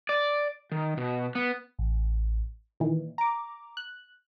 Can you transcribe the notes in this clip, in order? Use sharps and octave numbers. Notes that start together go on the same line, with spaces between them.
D5
D#3
B2
B3
A1
A#2 D#3 E3
A#5 D6
F#6